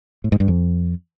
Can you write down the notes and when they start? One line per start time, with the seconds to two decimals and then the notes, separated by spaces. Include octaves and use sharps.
0.24 A2
0.32 G#2
0.40 G2
0.48 F2